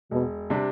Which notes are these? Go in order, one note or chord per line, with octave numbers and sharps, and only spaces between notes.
E1 B2
C3 G3 D4